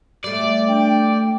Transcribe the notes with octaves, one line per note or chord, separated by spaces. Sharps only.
G3 A3 D5
D4 G5